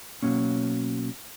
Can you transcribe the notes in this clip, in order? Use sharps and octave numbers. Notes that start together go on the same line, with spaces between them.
B2 D#3 F#3 A#3 C#4